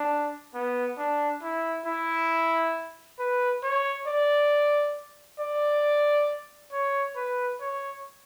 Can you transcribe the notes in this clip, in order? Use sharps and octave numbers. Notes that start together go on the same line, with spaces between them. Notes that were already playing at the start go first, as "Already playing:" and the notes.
Already playing: D4
B3
D4
E4
E4
B4
C#5
D5
D5
C#5
B4
C#5